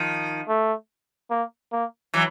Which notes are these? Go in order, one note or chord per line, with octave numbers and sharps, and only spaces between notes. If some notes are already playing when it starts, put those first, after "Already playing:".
Already playing: D#3 F3
A3
A#3
A#3
E3 F#3